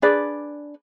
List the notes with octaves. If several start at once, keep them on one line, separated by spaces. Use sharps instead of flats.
D4 G#4 B4 D5